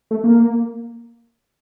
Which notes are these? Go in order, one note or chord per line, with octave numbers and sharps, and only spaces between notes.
A3
A#3